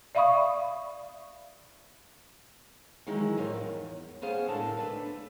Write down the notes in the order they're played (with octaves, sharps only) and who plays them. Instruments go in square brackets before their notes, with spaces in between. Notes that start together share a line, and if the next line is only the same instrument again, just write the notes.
[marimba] D5 E5 F5 B5 C#6 D#6
[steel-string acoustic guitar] D#3 E3 F#3 G#3 E4
A2 F3 B3 A#4 C#5
E2 G2
B3 C#4 G#4 C5 F5
A2 D3 E4 A#4 A5
A3 D4 B4